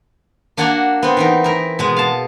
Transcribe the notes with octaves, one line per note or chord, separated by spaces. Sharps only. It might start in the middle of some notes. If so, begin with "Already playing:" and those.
A#3 D4 F#4 F#5 G#5 A#5
B3 C4
E3 D#4 A#4
E4 A#4
B2 G#3
F5 A5